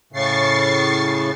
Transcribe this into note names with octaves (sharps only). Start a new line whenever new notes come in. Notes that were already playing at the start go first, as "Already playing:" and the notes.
A2 C#3 C#6 A6 C7